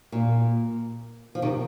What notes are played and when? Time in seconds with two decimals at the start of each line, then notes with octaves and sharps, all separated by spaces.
0.12 A#2
1.35 F3
1.42 C3 D#3